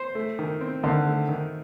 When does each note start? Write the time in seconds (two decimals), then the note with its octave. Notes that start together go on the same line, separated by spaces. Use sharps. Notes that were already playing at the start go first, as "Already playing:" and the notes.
Already playing: C5
0.15 A3
0.39 D#3
0.61 C4
0.83 D3 D#3
1.06 A3
1.29 D#3